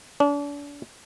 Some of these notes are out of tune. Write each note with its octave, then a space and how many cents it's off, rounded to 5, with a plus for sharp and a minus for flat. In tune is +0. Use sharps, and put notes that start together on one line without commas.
D4 -35